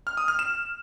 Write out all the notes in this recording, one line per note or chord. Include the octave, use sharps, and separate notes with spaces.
F6
D#6
F6
E7